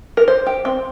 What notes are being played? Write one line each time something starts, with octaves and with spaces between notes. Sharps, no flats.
A#4
C5
G4
C4